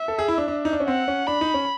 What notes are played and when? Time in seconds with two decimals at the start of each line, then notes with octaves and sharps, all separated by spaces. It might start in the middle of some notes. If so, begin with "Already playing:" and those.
Already playing: E5
0.08 A4
0.19 G#4
0.28 E4
0.38 D4
0.48 D4
0.65 D#4
0.73 D4
0.80 C#4
0.88 C4 F#5
1.08 C#4
1.27 D4 B5
1.41 D#4
1.54 C#4